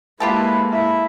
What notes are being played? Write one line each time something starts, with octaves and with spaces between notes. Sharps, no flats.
G#3 A#3 E4 F4 G4 A4 B4
E4 E5